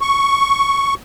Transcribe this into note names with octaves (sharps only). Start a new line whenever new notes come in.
C#6